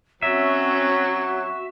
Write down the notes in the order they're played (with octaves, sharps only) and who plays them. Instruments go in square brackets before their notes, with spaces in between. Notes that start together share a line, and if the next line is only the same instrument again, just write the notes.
[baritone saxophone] F#3 [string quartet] C4 C#4 [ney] F#4 [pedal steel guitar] E5